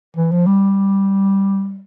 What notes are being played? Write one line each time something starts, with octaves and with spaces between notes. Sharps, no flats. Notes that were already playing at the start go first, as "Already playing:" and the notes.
E3
F3
G3